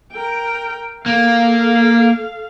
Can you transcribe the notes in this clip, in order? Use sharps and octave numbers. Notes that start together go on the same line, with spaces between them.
A#4 G5
A#3 A4 F5